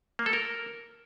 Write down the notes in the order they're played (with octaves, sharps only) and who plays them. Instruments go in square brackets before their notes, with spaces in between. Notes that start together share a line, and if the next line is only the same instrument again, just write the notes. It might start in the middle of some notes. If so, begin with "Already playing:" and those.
[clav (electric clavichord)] A#3
A4
A#4